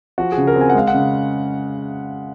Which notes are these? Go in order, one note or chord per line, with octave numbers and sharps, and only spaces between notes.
F3 F#4
G#4
C#3
A#4
C4
G#5
F#5
G#3 F5
F#5
C#3